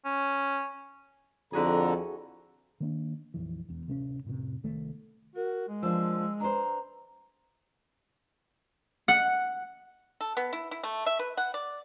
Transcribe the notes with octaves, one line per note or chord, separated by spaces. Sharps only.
C#4
F2 D3 E4 F#4 G#4 A#5
D#3 A#3 D4
A#1 F2 E3
E1 E2
D1 C3 B3 C#4
F2 A2 C3
C2 D#3 A3
F#4 A#4
G#3
F3 A#3 D4 E6
D4 B4 C5 A#5
F#5
A4
B3
E4
E4
A3
E5
B4
F#5
D5